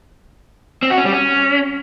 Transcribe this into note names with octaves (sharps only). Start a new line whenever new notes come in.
C4
F#4
C#4
G3
C#4